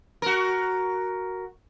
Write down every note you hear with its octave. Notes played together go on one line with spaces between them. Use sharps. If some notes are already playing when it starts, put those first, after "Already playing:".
F#4 A#4